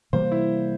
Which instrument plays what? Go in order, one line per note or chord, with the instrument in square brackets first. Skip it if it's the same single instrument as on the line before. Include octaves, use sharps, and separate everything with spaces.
[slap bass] C3 E3 G3 A#3 [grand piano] C5
[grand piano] E4